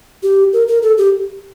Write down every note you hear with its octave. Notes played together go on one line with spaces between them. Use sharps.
G4
A#4
A#4
A4
G4